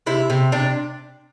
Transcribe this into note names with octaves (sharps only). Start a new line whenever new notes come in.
C3 E4
C3
C3 D4